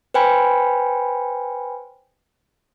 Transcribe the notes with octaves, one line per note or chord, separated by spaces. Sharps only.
B4 C5 G5 G#5 B5